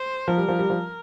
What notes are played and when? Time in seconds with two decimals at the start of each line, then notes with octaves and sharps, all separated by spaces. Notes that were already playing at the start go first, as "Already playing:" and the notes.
Already playing: C5
0.28 F3 A#4
0.38 G3
0.48 F3
0.59 G3
0.70 F3